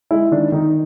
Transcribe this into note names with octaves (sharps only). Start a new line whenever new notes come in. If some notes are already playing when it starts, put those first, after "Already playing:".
G#3 E4
D#3 D4
D#3 D#4